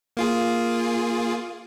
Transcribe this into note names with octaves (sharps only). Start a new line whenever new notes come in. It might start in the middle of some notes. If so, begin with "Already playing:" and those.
A#3 F4 G#4